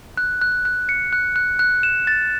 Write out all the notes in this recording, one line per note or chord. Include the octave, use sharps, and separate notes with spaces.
F#6
F#6
F#6
C#7
F#6
F#6
F#6
E7
A6